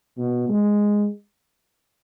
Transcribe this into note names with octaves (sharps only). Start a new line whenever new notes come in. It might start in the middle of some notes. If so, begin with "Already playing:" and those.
B2
G#3